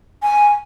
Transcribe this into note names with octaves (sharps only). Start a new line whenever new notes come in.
G#5